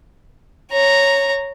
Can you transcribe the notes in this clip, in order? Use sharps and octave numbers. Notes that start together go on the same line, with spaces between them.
C#5 A#5